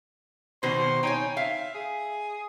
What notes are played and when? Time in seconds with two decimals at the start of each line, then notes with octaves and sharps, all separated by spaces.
0.63 B2 D#3 F#4 C5
1.03 D#4 C#5 G5 G#5
1.37 E5 F5
1.74 G#4